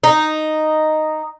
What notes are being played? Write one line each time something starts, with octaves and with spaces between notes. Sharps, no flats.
D#4